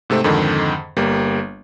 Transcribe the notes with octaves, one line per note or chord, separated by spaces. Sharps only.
G#2 C3 A3 C4
F2 G#2 D3 D#3
G1 G3 A#3